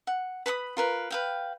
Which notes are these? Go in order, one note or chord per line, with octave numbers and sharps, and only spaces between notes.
F#5
B4 B5 C6 D#6
F4 A#4 B4
B4 F5 G5